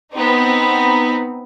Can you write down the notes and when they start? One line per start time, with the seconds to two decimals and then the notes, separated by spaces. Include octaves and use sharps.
0.13 B3 C4 D#4